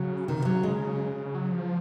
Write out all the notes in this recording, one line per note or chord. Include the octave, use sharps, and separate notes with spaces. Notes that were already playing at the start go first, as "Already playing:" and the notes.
Already playing: C#3 F#3
C3 D#3
C3
F#3
C#3
C#3 G#3
F#3
F3